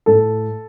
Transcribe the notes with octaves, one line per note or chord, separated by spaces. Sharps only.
A2 A4